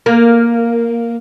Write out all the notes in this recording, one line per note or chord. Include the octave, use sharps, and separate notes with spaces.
A#3